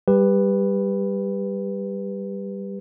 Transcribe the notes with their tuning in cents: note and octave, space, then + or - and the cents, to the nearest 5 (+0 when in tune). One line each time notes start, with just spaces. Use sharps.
G3 +0 G4 +20 B4 +0